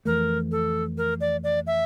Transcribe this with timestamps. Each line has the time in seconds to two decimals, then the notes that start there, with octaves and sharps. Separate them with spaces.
0.05 F2 E3 A3 A#4
0.52 A4
0.98 A#4
1.21 D5
1.44 D5
1.67 E5